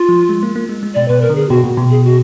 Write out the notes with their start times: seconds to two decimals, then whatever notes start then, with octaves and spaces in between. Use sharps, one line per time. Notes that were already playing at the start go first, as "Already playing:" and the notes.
Already playing: F4
0.09 F3
0.29 G#3
0.43 A#3
0.56 A#3
0.69 G#3
0.83 G#3
0.94 B2 D5
1.08 B2 B4
1.22 A#4
1.30 D3
1.35 G#4
1.49 B2 F#4
1.64 A#2
1.77 B2
1.90 G#4
2.04 F#4